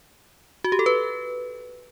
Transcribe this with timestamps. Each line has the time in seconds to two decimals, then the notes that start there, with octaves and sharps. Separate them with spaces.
0.64 F#4
0.72 G4
0.79 A4
0.86 B4